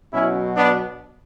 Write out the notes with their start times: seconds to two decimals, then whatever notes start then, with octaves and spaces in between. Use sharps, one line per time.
0.13 B2 F#3 C#4 E4
0.57 B3 D4